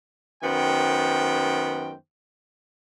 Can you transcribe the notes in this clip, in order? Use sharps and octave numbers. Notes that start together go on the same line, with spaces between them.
F#2 D#3 B3 C5 G5